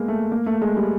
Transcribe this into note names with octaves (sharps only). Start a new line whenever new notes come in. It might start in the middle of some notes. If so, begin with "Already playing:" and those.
Already playing: G#3 A#3 B3
A3
A#3
A3
G#3
G3